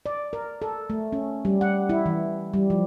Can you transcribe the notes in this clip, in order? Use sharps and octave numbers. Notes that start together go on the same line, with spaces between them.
D5
A#4
A4
A3
C#4
G3
F#5
E4
E3
G3
F3